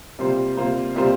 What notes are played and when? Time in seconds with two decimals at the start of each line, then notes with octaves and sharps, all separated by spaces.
0.19 C3 G3 A#3 F4 C5
0.57 C3 G3 A#3 F4 C5
0.96 C3 G3 A#3 F4 C5